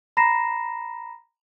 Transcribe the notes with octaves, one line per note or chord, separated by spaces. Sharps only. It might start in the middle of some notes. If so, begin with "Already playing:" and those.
A#5 B5 A#6 C7 E7